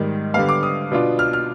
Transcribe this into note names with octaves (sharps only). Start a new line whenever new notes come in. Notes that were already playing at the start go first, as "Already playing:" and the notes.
Already playing: G#2 D#3 G3
D3 G3 B3 F5
D6
D#6
B2 B3 D4 F4
F6
F6